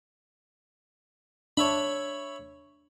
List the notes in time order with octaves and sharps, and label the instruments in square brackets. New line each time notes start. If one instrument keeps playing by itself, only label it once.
[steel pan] D4 [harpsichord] C#5 E5 B5